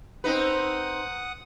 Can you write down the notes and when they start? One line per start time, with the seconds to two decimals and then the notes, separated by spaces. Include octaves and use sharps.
0.24 C4 D#4 B4 F#5 D#6